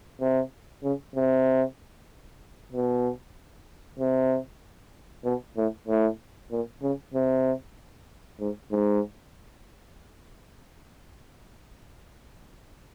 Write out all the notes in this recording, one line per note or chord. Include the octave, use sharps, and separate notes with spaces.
C3
C#3
C3
B2
C3
B2
A2
A2
A#2
C#3
C3
G#2
G#2